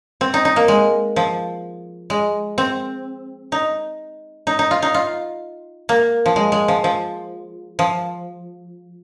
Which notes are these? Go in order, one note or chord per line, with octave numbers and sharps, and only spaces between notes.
C4
D#4
D#4
A#3
G#3
F3
G#3
C4
D#4
D#4
D#4
F4
D#4
F4
A#3
F3
G#3
G#3
F3
F3
F3